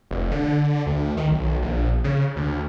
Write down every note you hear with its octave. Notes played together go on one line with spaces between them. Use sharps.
F1
D3
D2
D#3
B1
A#1
C#3
D2